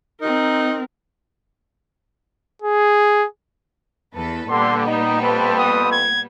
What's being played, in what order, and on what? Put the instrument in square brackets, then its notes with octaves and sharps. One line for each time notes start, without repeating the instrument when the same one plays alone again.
[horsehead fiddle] C4 A#4 [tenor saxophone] D#4
[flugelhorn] G#4
[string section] E2 A4 B4
[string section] A#2 G3 B3 [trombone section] D3 [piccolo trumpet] C6
[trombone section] D#4 [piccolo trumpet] D#5
[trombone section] F2 C4 B4 [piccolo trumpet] A5
[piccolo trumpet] D#6
G#6